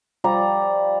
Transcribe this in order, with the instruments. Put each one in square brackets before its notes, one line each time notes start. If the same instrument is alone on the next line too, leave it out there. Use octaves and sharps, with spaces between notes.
[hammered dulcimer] F3 G3 D5 A#5